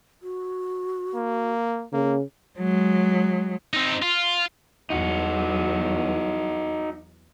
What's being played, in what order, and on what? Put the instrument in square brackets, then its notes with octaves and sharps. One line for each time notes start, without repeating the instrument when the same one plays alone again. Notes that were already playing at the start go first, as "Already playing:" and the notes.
[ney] F#4
[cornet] A#3
[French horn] C#3 [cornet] A#3
[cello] F#3 G#3
[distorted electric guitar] C4 D#4
F4
[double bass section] E2 F#3 [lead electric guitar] D#4 F#4